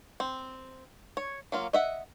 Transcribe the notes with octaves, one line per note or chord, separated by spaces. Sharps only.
C4
C#5
F#3 A#3 F4
D#5 E5 F#5